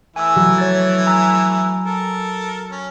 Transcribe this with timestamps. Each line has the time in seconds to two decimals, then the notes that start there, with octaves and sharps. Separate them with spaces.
0.16 E3 A3 E4 G#5 E6
0.36 F#3
0.58 C#5 G#6 A6
1.07 G#5 A#5 E6
1.86 A4 A#4
2.71 C#4